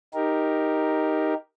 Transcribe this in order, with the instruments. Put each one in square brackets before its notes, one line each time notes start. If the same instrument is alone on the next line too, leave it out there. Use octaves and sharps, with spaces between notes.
[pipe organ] D#4 G4 A#4